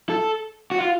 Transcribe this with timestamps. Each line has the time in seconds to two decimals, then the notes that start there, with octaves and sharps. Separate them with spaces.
0.10 A4
0.71 F#4
0.78 F4